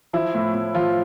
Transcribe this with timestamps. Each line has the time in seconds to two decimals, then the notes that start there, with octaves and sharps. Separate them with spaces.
0.13 F3 E4
0.35 A2
0.54 A2
0.75 F3 F4